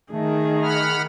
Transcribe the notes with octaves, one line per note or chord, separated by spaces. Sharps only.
D#3 A3 G#4
F#5 B5 F6